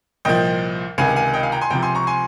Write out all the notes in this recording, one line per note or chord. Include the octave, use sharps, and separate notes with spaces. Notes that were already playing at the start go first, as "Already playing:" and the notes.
C2 A#2 F3 D#5 G5
C#2 C3 D#3 F5 G#5
F5 G#5
D#5 G5
F5 G#5
G5 A#5
G#5 C6
C#2 C3 F3 G5 A#5
G#5 C6
A#5 C#6
G#5 C6